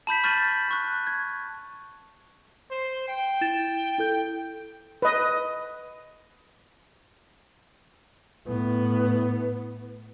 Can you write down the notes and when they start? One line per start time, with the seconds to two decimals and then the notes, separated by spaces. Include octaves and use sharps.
0.07 A5 B5 G6 B6
0.24 C#6 F6 G6 A6 D#7 F#7
0.69 A5 C#6 F#6
1.07 G#6
2.70 C5
3.08 G5
3.41 E4 A6 E7
3.98 E4 A4 G6
5.02 B4 D#5
8.47 A2 B3